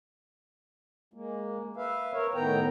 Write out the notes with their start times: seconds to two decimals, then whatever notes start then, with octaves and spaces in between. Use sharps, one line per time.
1.14 G#3 A#3
1.76 B4 E5 F5
2.13 A#4 C#5
2.34 A2 D#3 B3 G5 A#5